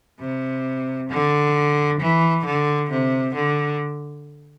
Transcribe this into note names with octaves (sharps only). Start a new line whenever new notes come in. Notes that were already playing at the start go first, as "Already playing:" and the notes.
C3
D3
E3
D3
C3
D3